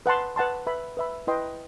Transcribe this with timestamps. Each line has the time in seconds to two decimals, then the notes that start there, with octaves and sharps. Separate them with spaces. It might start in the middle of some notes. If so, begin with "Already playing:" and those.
0.06 B4 F#5 A5 C6
0.36 B4 F#5 A5 C6
0.67 B4 E5 B5
0.97 B4 E5 B5
1.27 E4 B4 D#5 G5 C6